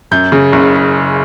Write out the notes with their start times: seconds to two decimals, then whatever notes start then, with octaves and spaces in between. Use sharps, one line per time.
0.11 F#2 G6
0.32 C#3
0.53 F#1